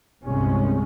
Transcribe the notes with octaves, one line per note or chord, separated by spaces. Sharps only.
G1 C2 C3 G#3 C#4